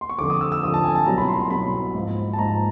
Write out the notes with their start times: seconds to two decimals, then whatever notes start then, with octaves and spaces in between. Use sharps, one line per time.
0.01 C6
0.09 C#6
0.18 F2 D3 F3 D6
0.30 D#6
0.41 E6
0.52 E6
0.62 F2 D3 F3 D#6
0.74 A5
0.85 G#5
0.95 A5
1.06 C2 B2 F#3 A#5
1.18 B5
1.28 C6
1.40 C6
1.50 C2 B2 F#3 B5
1.95 G#2 F3
2.33 A5
2.39 G#2 F3 A#5